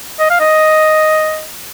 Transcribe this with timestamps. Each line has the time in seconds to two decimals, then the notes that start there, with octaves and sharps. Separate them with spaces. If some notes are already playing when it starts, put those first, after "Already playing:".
0.20 D#5
0.30 F5
0.40 D#5